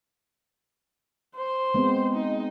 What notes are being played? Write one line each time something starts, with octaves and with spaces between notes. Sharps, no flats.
C5
G#3 B3 C4
D#4